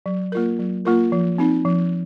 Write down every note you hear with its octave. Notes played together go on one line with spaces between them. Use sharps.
F#3
A#3 F4 A#4
F#3
A#3 F4 A#4
F3
C4 D#4
F3